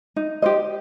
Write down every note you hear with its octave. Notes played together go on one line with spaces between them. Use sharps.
D#4
G4 C5 D#5